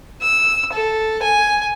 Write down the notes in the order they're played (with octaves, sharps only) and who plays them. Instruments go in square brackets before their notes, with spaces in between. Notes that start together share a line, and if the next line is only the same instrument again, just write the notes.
[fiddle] E6
A4
G#5